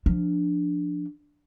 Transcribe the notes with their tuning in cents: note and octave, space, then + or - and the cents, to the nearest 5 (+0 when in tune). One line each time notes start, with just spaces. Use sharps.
F3 +0 D4 +0